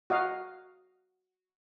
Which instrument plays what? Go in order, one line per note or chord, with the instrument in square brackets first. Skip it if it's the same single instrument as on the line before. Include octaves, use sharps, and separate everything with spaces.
[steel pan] F#4 D#5 F5